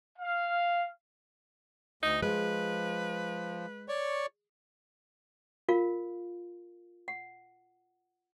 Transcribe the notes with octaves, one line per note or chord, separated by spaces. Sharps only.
F5
D2 D#4 D#5
F3 G#3 B4
C#5 D5 C#6
F4 A#4 F5
F#5